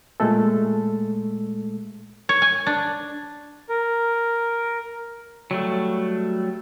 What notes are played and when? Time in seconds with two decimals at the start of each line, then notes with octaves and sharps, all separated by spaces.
0.20 A#2 G#3 A3 A4
2.29 C#5
2.42 G#5
2.67 D4
3.69 A#4
5.51 F#3 G3 A3